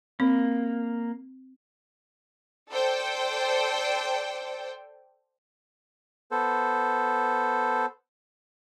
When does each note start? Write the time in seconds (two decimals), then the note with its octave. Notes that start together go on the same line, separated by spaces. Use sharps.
0.20 A#3 C4
2.71 A4 C5 D5 G5
6.31 B3 A4 C5